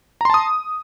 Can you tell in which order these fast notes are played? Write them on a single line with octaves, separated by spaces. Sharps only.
A#5 C6 A5 D#6